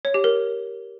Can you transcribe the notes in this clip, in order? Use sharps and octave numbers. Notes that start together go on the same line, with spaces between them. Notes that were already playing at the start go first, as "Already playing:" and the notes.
C#5
G4
A#4